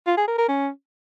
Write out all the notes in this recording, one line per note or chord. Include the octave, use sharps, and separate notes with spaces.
F4
G#4
A#4
A#4
C#4